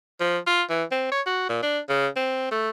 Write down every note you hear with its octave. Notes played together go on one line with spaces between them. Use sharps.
F3
F4
E3
C4
C#5
F#4
A#2
D4
C#3
C4
A3